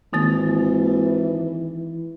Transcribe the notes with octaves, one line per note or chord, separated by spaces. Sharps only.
G#1 D#3 E3 A#3 A6